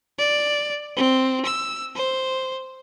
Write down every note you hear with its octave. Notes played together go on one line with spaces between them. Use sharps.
D5
C4
E6
C5